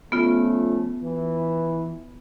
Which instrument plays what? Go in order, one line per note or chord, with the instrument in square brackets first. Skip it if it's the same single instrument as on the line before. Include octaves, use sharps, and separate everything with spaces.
[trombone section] F3 A3 C#4 [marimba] B3 F4
[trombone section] E3